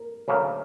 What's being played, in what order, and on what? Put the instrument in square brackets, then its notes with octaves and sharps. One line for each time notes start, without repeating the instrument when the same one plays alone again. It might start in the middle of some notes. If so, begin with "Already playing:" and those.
Already playing: [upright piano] A#4
[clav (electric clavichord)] D2 C#3 F#3 A#3